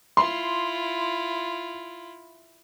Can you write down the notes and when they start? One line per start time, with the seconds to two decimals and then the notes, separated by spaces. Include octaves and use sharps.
0.17 E4 F4 C6